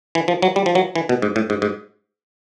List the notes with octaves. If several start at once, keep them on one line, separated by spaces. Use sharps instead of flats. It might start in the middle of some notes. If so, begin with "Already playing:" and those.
E3
F3
F#3
G3
F3
F#3
E3
B2
G#2
A2
G#2
G#2